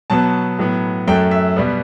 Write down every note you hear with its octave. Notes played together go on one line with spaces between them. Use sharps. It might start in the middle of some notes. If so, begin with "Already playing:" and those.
B2 F#3 B3 A5
A2 F#3 B3
F#2 F#3 A3 G5
E5
B2 G3 B3